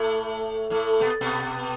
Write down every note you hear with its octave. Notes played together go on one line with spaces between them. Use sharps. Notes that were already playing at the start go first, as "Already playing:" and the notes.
Already playing: A2 A3
A2 A3
B2 B3
B2 B3